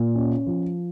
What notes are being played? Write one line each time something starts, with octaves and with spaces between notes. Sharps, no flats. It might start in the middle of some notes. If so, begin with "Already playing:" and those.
Already playing: A#2
C#4
F3